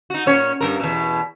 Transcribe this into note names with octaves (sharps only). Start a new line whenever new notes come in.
D#4 F#4
A#2 C#4 C#5
G2 D3 A#4
E2 B2